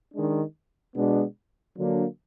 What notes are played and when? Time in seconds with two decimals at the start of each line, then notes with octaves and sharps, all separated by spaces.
0.14 D#3 G#3 D4
0.96 B2 G#3 B3 D4
1.77 D3 F#3 A#3 D4